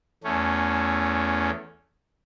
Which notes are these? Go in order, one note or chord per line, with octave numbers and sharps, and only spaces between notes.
E2 A3 C#4